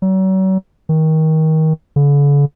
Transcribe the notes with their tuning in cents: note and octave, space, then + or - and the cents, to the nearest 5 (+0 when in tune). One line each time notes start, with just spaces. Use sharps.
F#3 +40
D#3 +25
D3 -45